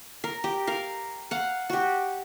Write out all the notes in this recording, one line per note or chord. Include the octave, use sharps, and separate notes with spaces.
A#4
G4
A#4 F5
F5 F#5
F#4 G4